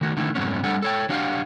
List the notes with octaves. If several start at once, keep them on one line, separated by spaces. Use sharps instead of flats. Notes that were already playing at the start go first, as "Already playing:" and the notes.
D#3 A3 F#4
D3 D#3 A3 E4
F2 G#2 F#3 A3 B3 C#4
G3 A3 D4 A4 F#5
A4 C#5 G5
F#3 D4 F#4 G4 F5